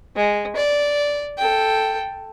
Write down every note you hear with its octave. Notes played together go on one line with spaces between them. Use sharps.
G#3
D5
A4 G5